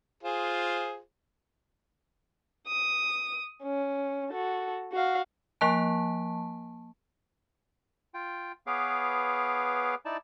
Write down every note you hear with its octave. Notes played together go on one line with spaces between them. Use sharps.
F4 G#4 C5
D#6
C#4
F#4 A4
F#4 F5
F3 A#3 A5
F4 G5
B3 G#4 B4 C#5 F5 D6
D#4 E4 D5 A5